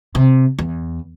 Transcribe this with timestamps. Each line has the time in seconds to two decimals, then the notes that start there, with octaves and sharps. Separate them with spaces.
0.15 C3
0.59 E2